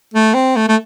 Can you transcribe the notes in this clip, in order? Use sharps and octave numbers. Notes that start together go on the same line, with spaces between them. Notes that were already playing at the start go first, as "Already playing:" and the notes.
A3
C4
A3
A3